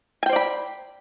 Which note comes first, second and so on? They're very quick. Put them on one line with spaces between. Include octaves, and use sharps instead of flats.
G#5 G5 C5 D5 B5